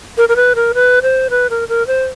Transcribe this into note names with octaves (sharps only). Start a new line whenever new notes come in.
A#4
A#4
B4
A#4
B4
C5
B4
A#4
A#4
C5